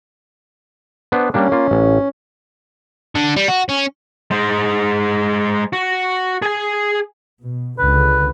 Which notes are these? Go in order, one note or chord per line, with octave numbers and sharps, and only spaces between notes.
B3 D4 C5
G3 A#3 C#4 D4
A#3 F4
A1
D3
G3
F#4
C#4
G#3 C5
F#4
G#4 G#5
B2
C#2 D3 B4